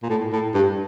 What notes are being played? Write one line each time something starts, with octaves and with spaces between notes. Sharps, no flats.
A#2
A2
A2
G2